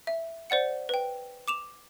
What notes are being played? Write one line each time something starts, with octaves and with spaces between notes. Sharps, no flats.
E5
C5 D5 F#5 C#7
B4 G5
D6 E7 F7